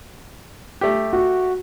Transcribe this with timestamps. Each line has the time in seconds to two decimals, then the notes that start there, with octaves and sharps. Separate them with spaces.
0.81 A3 G4
1.13 F#4